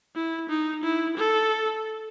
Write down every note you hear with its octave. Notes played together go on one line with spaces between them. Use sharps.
E4
D#4
E4
A4